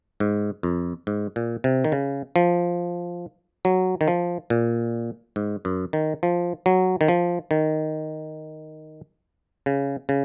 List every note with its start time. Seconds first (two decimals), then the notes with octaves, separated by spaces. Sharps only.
0.20 G#2
0.63 F2
1.07 G#2
1.36 A#2
1.64 C3
1.84 D#3
1.92 C#3
2.36 F3
3.65 F#3
4.01 D#3
4.08 F3
4.50 A#2
5.36 G#2
5.65 F#2
5.93 D#3
6.23 F3
6.66 F#3
7.01 D#3
7.08 F3
7.51 D#3
9.66 C#3
10.09 C#3